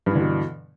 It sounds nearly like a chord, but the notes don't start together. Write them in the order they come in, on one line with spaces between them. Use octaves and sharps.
G2 E3 D3 B2